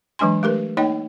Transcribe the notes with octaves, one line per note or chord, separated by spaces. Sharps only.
E3 F#3 G#3 D4 G#5 C6
A3 G4 A#4 B4
A#3 D#4 C#5 D#5 G5